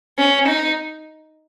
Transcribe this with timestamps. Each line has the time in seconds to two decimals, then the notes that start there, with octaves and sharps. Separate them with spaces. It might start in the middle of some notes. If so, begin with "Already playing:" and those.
0.19 C#4
0.48 D#4